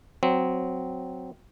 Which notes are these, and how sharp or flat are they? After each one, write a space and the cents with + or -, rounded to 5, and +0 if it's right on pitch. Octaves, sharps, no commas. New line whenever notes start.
F#3 +0 C4 -10